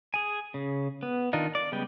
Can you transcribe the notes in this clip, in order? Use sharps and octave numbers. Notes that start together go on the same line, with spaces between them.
G#4 G#5
C#3
B3
D#3 D4 D#4 F4
D5
C#3 G3 G#3 B3 G5